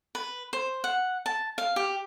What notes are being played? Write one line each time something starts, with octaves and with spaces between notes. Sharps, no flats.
B4
C5
F#5
A5
F5
G4